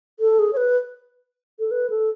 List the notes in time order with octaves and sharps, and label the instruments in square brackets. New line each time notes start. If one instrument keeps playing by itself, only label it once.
[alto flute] A4
G#4
C#5
B4
A4
B4
A4